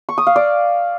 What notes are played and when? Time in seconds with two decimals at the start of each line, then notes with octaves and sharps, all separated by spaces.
0.09 C#6
0.18 D#6
0.27 F5
0.36 D5